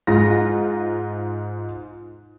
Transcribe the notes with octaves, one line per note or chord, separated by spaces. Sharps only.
G#2 F4 A#6